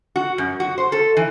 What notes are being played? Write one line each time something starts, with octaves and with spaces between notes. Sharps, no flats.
F#4
F#2
F#4
C5
A4
E3